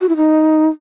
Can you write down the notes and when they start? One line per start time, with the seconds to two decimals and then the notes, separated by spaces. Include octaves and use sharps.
0.01 F#4
0.09 E4
0.16 D#4